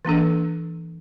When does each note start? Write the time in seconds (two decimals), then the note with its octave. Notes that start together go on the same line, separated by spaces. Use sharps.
0.05 E3 A#3 D4 A4